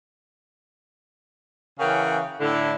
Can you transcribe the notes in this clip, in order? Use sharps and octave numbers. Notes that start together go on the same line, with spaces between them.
C#3 E3 C#4 A#4 F#5 G5
A2 D3 E4